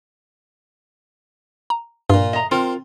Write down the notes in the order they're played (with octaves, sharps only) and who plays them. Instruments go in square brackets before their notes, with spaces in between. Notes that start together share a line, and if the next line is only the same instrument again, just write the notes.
[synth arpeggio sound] A#5
[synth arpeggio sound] G2 [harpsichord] A#2 F4
[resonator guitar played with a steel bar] D#5 A#5
[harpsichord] C4 [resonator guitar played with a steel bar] F4 A#4